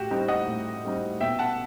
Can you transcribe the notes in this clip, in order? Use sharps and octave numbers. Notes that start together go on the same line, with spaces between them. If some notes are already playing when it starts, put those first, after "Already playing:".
Already playing: A2 F#4 G4
G3 C4 D#4 G4
D#5 F#5
A2
G3 C4 D#4
B2 E5 G5
F#5 A5